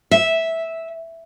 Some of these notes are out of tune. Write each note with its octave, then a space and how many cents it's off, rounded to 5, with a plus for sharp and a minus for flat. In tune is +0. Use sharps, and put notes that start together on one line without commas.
E5 -10